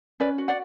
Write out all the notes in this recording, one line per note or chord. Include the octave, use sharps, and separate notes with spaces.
C#4 B4 D5
F#4
D5 F#5